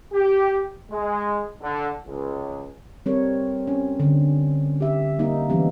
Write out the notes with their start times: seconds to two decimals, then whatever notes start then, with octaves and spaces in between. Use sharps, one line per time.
0.13 G4
0.91 G#3
1.61 D3
2.06 C#2
3.06 G3 C4 A4 A#4 C#5
3.68 C#4
4.00 D3
4.81 G4 E5
5.19 G3 A#3 D#4
5.49 E3 F3 G3 B3 C#4